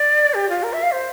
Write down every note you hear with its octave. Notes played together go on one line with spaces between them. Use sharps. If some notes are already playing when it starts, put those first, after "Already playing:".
Already playing: D5
G4
F4
A#4
E5
F5
C5